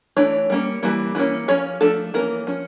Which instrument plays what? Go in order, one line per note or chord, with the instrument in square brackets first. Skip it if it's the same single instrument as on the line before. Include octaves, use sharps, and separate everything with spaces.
[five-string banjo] E3 A3 D4 C#5
G3 A#3 C#4
E3 G3 A#3
E3 G3 A#3 C#4
F3 C#4 C#5
F3 A3 D4 A4
E3 A#3 C#4 A#4
F3 C#4